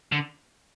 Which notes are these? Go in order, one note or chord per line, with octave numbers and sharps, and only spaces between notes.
D3